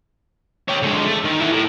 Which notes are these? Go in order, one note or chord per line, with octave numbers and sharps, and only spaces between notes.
G4 C#5
D3 G#3
A3
D#3
E4 F#5
A2